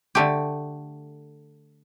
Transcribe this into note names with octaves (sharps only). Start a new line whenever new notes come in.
D3 A3 G4